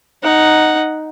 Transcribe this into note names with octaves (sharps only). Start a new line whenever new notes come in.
D#4 F#5